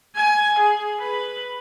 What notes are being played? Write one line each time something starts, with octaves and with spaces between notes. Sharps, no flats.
G#5
G#4
B4